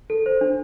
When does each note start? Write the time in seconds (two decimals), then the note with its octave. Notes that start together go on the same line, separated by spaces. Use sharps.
0.10 A4
0.26 C5
0.41 D4